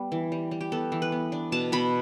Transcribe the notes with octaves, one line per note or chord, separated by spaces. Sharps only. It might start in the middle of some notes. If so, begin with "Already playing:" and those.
Already playing: G3 B3
E3
G3
G3
G4
B3 A4
E3
B4
B3
D4
B2 A5
B2 B5